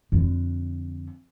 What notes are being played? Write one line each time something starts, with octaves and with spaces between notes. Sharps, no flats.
F2 D3